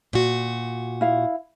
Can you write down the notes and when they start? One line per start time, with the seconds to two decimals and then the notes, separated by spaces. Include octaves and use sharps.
0.13 A#2 F#4
1.01 E4 F5